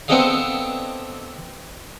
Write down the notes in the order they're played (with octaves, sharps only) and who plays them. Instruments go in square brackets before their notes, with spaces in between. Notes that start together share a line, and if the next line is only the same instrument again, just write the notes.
[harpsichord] B3 C4 D4 A4 D#5 F5